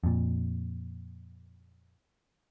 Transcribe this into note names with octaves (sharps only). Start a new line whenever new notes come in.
F2 A#2